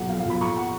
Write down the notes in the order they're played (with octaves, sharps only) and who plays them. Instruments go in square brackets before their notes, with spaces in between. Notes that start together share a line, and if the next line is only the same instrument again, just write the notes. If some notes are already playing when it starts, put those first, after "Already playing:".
Already playing: [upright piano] B1 A#2 F#5
F3 F5
F5
B1 B5
A#2 C#6
F#5